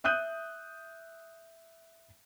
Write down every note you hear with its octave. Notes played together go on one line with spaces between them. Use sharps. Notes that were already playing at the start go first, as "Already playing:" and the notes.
E5 D#6 F#6 G6 D#7